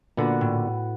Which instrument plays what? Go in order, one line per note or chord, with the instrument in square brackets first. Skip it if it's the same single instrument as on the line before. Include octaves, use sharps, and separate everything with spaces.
[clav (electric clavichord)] A#2 D3 [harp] B3 F#4
[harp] A2